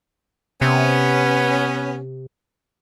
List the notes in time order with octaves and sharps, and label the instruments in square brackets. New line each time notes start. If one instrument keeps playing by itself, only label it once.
[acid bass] C3 [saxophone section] B3 C#4